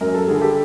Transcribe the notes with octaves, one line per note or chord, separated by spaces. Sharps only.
F#2 A#4
A4
D3 G3 G#4
G4 A4